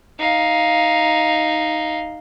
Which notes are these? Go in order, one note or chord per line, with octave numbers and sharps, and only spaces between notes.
D#4 F5